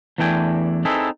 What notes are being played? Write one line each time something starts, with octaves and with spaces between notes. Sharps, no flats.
E2 E3 A3 D4 G5 G#5
C4 D#4 E4 G#4 A4 B4